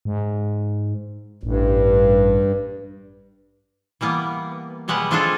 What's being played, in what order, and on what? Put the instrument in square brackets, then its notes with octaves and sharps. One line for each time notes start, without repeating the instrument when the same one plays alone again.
[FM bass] G#2
[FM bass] A1 [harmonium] G2
[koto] E3 G3 A#3 B3
B2 G3 G#3 B4 F#5
G#3 C4 D4 F4 G#4 A4